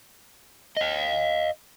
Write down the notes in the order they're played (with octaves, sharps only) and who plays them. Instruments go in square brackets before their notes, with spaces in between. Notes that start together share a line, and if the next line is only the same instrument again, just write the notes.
[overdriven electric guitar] D#5 F5